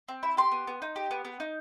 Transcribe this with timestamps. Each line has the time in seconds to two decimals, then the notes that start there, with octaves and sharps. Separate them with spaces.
0.08 C4
0.23 E4
0.37 G4 C6
0.52 B3
0.67 B3
0.82 D#4
0.96 G4
1.11 B3
1.25 B3
1.40 D#4